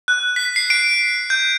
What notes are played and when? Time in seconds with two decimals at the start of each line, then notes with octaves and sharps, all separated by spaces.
0.08 F#6
0.36 B6
0.56 C7
0.70 D7
1.30 G6